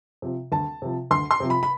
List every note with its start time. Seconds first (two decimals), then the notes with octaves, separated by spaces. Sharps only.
0.22 C3 F3
0.52 D2 A5
0.82 C3 F3
1.11 D2 C6
1.31 C6
1.40 C3 F3
1.50 B5
1.63 B5